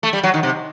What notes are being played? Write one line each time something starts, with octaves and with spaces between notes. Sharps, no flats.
A3
G3
F#3
D#3
C3